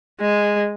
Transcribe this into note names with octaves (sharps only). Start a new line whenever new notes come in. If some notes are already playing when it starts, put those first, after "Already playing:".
G#3